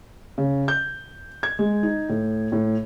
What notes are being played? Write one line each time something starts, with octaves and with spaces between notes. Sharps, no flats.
C#3
G6
G#6
G#3
D#4
A2
A2